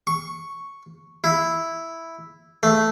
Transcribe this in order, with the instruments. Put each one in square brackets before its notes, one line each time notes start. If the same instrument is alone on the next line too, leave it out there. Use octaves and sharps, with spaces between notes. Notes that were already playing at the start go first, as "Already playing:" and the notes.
[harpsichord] C#6
E4
A3